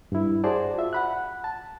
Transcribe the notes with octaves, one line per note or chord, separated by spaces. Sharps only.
G2 E4
F#4 G#4 C5 D5 A5
F4 E5
F#5 B5 F#6
A5